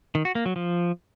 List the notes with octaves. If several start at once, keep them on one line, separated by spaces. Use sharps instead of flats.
D#3
F#4
A#3
F#3
F3